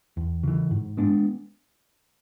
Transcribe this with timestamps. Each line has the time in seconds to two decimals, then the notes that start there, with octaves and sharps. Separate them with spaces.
0.17 E2
0.43 C#3 E3
0.71 G#2
0.97 G#3 B3 D4